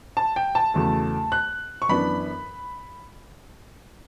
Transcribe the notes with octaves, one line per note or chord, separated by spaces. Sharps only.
A5
G5
A5
E2 C#3 F#3 A3
F#6
C#6
F#2 E3 B3 D4 B5